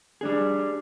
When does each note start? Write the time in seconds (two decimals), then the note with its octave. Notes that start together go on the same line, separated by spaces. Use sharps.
0.21 G3 D4 G#4